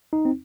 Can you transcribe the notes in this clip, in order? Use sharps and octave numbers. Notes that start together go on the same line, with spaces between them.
D#4
C4